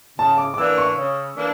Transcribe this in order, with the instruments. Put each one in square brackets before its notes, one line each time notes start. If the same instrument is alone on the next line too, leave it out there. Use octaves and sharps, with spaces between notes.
[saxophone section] C#3 [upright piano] A5
[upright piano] D6
D6
[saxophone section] E3 A#3 D4 [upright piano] E6
[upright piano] C#6
[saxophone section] C#3
E3 A#3 D4